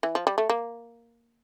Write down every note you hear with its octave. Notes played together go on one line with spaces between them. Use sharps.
E3
F3
G3
A3
A#3